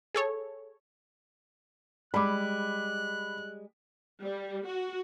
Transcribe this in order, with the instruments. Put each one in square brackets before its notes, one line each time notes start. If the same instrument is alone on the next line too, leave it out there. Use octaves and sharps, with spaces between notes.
[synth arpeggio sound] G#4 A4 C#5
[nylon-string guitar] G3 G#3 [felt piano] B5 D6 [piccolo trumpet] F#6
[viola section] G3
F#4